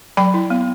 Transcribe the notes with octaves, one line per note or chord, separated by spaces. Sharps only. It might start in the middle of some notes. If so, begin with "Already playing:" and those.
F#3 G5 B5
E4
B3